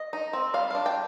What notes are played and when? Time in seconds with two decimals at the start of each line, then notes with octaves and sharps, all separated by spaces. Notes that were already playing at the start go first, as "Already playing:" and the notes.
Already playing: D#5
0.13 D#4
0.33 C4
0.54 G3 F5
0.71 D4 F5
0.86 G5